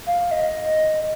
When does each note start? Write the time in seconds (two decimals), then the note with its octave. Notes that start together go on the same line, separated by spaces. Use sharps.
0.07 F5
0.31 D#5